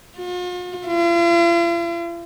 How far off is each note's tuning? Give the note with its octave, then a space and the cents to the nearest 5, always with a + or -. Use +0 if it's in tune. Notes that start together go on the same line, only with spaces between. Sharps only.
F4 +45
F4 -45